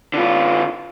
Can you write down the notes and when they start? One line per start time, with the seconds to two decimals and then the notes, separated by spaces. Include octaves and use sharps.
0.14 D3 F4